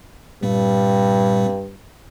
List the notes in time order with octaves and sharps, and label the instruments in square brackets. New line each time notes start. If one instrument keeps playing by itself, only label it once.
[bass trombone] G2 [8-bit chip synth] A#2 G3 C4